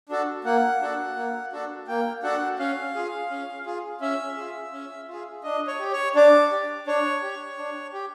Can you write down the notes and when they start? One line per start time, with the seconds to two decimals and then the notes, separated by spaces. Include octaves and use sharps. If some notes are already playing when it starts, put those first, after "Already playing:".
0.09 D4 F#4 A4
0.44 A#3 F#5
0.81 D4 F#4 A4
1.16 A#3
1.52 D4 F#4 A4
1.88 A#3 G5
2.23 D4 F#4 A4 F#5
2.59 C#4 F5
2.95 F4 G#4
3.30 C#4
3.66 F4 G#4
4.01 C#4 E5
4.37 F4 G#4
4.73 C#4
5.08 F4
5.13 G#4
5.44 D4 D#5
5.67 C#5
5.80 G4
5.92 C#5
6.15 D4 D5
6.51 G4
6.87 D4 C#5
7.22 G4
7.58 D4
7.93 G4